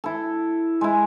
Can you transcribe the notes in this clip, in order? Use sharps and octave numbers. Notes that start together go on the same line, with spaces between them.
E4 A4
G#3 E4